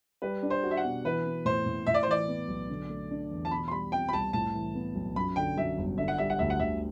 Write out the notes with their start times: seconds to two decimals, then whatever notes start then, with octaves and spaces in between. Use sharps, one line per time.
0.22 G3 B4
0.43 D4
0.50 C5
0.63 F#4
0.71 E5
0.77 F#5
0.85 B2
1.05 E3 B4
1.25 B3
1.45 A2 C5
1.66 A2
1.87 A2 E5
1.94 D5
2.03 C5
2.07 E3 D5
2.28 B3
2.48 B1
2.69 D3
2.90 A3
3.11 D4
3.31 E2
3.45 A5
3.51 B2 B5
3.68 C6
3.71 G3 B5
3.92 C4 G5
4.09 B5
4.13 C2 A5
4.33 A2 A5
4.55 E3
4.75 B3
4.95 B1
5.16 F#2 B5
5.36 D3 G5
5.57 F#3 E5
5.78 G1
5.98 D3 E5
6.08 F#5
6.18 G3 E5
6.30 F#5
6.39 D2 E5
6.50 F#5
6.60 D2 E5